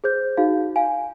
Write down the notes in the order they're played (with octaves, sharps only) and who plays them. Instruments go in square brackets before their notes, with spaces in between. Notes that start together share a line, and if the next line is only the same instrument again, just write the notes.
[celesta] G#4 C5 G6
D#4 F#4 G#4 F5
F5 G#5